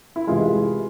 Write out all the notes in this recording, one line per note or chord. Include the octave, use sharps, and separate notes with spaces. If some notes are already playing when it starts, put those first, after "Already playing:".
E4
C2 C3 E3 G#3 F4